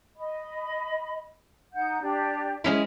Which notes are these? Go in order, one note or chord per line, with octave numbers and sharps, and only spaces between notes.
D#5 B5
D#4 F#5 G6
D4 G4 D5
G#3 C#4 E4